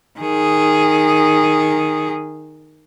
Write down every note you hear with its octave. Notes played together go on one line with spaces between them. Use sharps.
D#3 G#4